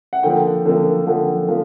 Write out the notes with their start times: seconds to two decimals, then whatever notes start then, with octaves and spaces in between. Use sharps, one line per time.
0.13 F#5
0.23 D3 F3 A#3 G5
0.65 D3 F3 A#3
1.07 D3 F3 A#3 F#5
1.48 D3 F3 A#3